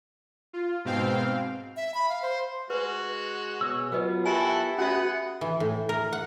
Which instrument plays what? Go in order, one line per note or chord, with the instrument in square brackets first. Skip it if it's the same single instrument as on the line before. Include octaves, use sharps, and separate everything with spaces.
[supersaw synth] F4
G#2 B2 C4 F5 G5
[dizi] E5
B5
F5
C5
[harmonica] G#3 F#4 [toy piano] B4
[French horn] B2 [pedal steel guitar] G#4 C#5 E6
[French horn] F#3 [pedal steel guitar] B3 F4 [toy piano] A#4 B4 D#5
[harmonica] E4 F#4 A4 [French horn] G4 [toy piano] G#5
[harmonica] B3 G#4 F#5 [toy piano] C#4 F#4 E5
[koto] E3
A2
A#4
F#5